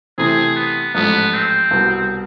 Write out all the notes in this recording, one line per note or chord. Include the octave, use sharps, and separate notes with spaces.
C3 E3 A3 C4 G#4
B3
A1 G#2 F3 A3 B3
C4
C2 B2 B3